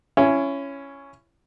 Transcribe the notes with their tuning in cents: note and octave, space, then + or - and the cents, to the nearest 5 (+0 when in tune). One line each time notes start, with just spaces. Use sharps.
C#4 +0 E4 +30